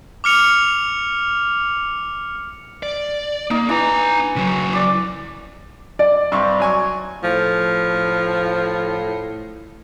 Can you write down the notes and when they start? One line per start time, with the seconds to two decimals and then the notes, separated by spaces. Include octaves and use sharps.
0.24 D6 F6 C#7 F7
2.83 D5
3.51 A#3 D#4
3.69 E3 D4 A#5
4.36 C#3 F#3
4.73 D5 D6
5.99 D5
6.32 G2 C3 C#6
6.60 F#3 G#5 C#6
7.23 A2 F3